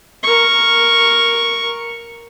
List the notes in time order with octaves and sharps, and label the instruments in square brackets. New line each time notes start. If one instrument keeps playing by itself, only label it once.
[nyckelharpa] A#4 C#6